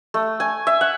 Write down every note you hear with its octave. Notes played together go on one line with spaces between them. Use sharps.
A3
G#5
E5
F#5